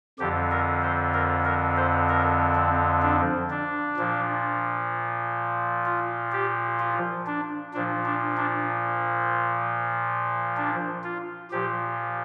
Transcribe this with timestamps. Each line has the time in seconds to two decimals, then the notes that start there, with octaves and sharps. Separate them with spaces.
0.19 F2 D3 F3 G4
0.51 A#4
0.83 C5
1.13 A#4
1.45 A#4
1.77 C5
2.09 A#4
2.55 C4
3.02 D4
3.50 D4
3.97 A#2 F3
5.85 F4
6.32 G4
6.80 F4
7.27 D4
7.73 A#2 F3 D4
8.06 D4
8.37 D4
10.57 D4
11.04 F4
11.51 A#2 F3 G4